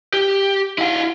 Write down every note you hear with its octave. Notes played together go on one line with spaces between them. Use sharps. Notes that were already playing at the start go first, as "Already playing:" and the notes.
G4
E4 F5